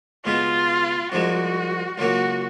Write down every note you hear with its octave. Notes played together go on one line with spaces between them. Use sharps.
C#2 B2 G#3 B3 F4
C2 C3 F3 G#3 F#4
C#2 C#3 F#3 A#3 F#4